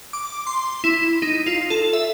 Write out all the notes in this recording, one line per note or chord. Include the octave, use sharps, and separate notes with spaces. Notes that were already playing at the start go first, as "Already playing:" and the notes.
D6
C6
E4
D#4
F4
A4
E5